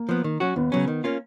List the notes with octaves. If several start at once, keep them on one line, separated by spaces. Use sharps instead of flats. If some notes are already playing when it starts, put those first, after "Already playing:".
Already playing: A#3
F3 B3
D#3
F#3 C#4 F#4
D#2 B3
C#3 F#3 C#4
D#3
A#3 C#4 F4